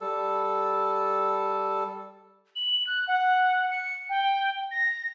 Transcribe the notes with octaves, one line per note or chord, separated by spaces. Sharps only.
G3 A4
F#7
F#6
F#5
C#7
G5
A#6